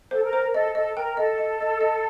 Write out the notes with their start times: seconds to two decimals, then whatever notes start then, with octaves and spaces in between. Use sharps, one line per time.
0.11 A4 C5
0.23 A#4
0.33 C5
0.54 A4 D#5
0.75 A4 D#5
0.96 A#4 G5
1.17 A4 D#5
1.38 D#5
1.60 D#5
1.81 D#5